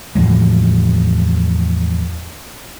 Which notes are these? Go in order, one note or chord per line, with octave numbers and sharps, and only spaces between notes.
E2 A2 F3 G#3